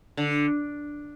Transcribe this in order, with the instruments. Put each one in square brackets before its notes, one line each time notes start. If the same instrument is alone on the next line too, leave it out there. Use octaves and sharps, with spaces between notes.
[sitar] D3